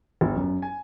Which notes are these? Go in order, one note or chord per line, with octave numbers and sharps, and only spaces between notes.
G1
F#2
G#5